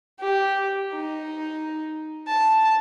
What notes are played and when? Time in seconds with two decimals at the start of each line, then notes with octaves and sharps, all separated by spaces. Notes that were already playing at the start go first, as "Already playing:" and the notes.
0.20 G4
0.93 D#4
2.27 A5